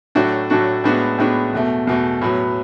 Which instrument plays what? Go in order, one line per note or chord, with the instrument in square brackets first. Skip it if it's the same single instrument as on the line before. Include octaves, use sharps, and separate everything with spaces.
[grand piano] A2 F#3 A3 D4 F#4
A2 F#3 A3 D4 F#4
A2 G#3 B3 D4 F#4
A2 G#3 B3 D4 F#4
E2 B2 A3
E2 B2 A3
A2 F#3 B3